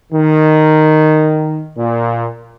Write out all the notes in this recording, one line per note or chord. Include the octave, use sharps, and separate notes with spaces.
D#3
A#2